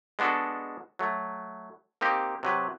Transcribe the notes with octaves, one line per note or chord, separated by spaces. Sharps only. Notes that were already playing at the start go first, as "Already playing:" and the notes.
G#3 B3 D4 F#4 A4
F#3 A3
A#3 C4 D#4 G4
C3 F#3 B4